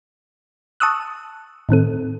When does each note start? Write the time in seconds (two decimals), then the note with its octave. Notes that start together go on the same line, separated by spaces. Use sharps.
0.80 A5 C#6 D#6 E6 F#6
1.69 A2 D#3 C4 A4